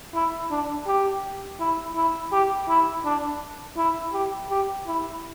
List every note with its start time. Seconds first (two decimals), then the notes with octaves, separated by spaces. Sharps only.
0.14 E4
0.51 D4
0.87 G4
1.60 E4
1.96 E4
2.32 G4
2.68 E4
3.05 D4
3.77 E4
4.13 G4
4.50 G4
4.86 E4